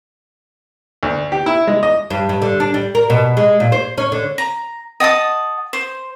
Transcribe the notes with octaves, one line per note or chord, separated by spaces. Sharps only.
D2
G4
E4
G#3
D#5
G2
G2
D3
D4
G3
A#4
B2
G#3
A#2
C5
C#4
D3
A#5
D#5 F#5 A5 D#6
C5